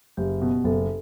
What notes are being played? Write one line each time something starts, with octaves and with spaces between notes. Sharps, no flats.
F#1 G4
B2
F#1 A4